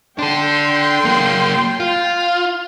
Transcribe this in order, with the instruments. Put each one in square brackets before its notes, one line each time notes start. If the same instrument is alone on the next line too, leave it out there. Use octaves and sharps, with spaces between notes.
[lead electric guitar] D4 A4 [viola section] G5 C6
[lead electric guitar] F#3 A#3
F4